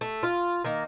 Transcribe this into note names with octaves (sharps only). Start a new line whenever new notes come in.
A3
F4
D#3 A#3